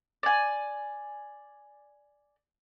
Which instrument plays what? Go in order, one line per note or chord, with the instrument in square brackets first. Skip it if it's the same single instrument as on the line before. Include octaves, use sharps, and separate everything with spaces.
[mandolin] D5 G#5